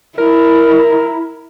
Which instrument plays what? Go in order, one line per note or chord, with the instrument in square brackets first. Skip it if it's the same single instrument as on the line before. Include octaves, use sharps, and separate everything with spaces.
[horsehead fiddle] E4 [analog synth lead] A#4